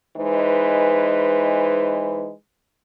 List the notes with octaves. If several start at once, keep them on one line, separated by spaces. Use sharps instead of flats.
E3 G#3 D#4 B4 C5